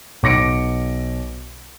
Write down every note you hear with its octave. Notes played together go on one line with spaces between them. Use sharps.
B1 D6 A#6 C#7 D7